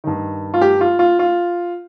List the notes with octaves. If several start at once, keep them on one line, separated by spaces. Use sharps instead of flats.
G2 D#3
F4
G4
F4
F4
F4